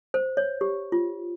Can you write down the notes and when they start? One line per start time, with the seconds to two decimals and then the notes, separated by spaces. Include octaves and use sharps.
0.14 C5
0.37 C#5
0.61 G4
0.92 F4